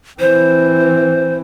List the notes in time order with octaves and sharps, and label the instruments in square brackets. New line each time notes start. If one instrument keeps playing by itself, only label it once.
[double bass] E3 C4 [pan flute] C5